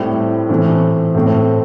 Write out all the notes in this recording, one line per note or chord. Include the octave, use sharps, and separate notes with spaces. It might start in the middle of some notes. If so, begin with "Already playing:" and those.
Already playing: A2 G3 C4 E4
A2 E3 A3 C4
A2 A3 C4